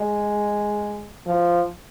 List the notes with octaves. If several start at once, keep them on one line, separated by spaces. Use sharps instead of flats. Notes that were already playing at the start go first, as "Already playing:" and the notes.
Already playing: G#3
F3